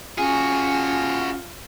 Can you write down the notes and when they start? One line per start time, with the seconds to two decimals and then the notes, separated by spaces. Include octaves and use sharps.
0.18 C#4 F4 F#4 G#4 G#5